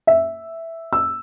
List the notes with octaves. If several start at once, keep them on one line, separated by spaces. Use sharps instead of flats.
E5
E6